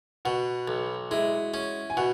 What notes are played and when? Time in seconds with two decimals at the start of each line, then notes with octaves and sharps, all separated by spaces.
0.25 B2 F#4 F#5
0.68 B1
1.11 G#3 E4 E5
1.54 C#4
1.90 G#5
1.97 B2 F#4 F#5